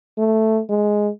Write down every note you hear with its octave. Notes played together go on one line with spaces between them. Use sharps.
A3
G#3